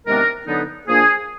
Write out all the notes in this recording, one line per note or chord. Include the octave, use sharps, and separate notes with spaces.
C3 D#3 G#3 B3 D4 A#4
D3 F#3 B3 D#4
A#2 F3 A#3 D4 G#4